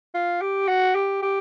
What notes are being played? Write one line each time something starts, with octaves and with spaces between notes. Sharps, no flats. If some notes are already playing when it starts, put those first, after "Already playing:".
F4
G4
F#4
G4
G4